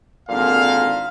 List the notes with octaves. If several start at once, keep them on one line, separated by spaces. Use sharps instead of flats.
G#1 A#2 D3 F5